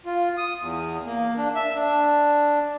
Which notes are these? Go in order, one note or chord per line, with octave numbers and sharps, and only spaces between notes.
F4
D#6
E2
A#3
D4
E5
D4